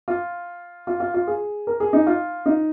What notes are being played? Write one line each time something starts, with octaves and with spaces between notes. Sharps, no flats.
F4
F4
F4
F4
G#4
A#4
G#4
D#4
F4
D#4